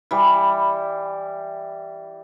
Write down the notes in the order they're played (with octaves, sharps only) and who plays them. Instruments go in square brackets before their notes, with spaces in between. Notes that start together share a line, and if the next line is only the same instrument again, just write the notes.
[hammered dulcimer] E3 G3